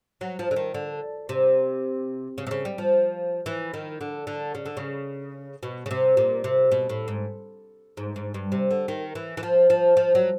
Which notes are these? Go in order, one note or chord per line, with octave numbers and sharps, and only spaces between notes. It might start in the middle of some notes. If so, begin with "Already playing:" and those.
F#3
F3
D3
D#3
D3
C3
C#3
C3
C#3
G3
F3
E3
D#3
D3
D3
C#3
D3
C#3
B2
C#3
C3
A#2
C3
B2
A2
G#2
G#2
G#2
G2
C3
D3
D#3
E3
E3
F3
F3
F3
F#3